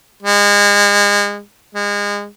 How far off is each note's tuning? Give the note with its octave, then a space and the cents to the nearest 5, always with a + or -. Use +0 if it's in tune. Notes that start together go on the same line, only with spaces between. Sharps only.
G#3 -30
G#3 -30